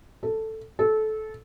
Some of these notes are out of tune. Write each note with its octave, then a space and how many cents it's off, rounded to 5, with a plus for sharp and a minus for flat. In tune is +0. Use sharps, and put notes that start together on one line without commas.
A4 +5
A4 -20